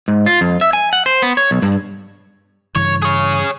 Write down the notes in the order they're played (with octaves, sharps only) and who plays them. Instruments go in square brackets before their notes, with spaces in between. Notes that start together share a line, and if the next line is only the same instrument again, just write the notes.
[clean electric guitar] G#2
F4
F2
E5
G#5
F#5
C5
B3
C#5
B1
G2
[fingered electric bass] G2 C#3 E3 [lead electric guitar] C#5
[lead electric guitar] G#4 C#5